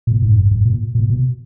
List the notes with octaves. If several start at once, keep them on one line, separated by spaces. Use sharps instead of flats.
A#2
G#2
G2
G2
A#2
A#2
B2